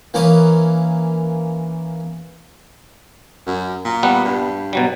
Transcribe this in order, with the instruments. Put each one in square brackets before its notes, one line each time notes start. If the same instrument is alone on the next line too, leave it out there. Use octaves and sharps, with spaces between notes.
[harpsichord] E3 A#3 C#4 B4 D6 D#6
[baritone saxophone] F#2
A#2
[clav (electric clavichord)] G3 B3 F#5
[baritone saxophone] G2
[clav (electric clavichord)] B2 F#3 G3